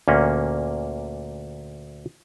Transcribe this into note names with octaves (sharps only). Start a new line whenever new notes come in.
D2 A#2 A#3 C#4